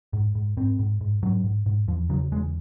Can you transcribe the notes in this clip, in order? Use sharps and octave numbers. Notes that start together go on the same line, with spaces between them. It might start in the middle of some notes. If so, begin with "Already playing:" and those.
G#2
G#2
G#2 C4
G#2
G#2
G#2 F#3
G#2
G#2
E2 F3
C#3 F#3
E2 G#3